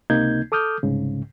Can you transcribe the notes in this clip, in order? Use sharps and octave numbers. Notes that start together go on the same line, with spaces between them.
C#2 C3 A#3 D#4 G6 G#6
A4 D6 D#6 F6 G6
C2 G#2 C#3